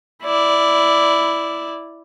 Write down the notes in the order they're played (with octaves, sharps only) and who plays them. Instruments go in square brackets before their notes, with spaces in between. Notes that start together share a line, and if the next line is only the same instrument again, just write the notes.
[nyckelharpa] E4 D5